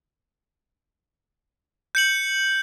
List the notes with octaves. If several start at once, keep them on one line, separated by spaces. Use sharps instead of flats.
G6 C#7 F#7